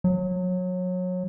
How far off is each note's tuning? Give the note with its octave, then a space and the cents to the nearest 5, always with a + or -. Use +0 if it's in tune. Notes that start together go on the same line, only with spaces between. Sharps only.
F#3 -25